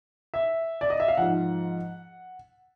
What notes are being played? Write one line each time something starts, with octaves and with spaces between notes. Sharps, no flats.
E5
D5
D#5
E5
F5
G#2 F3 F#5